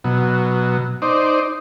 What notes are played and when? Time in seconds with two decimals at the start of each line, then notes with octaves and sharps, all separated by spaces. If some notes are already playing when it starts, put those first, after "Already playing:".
0.04 B2 F#3
1.02 D#4 C5 D5